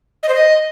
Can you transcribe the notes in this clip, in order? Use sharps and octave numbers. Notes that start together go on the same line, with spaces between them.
D#5
C5
D#5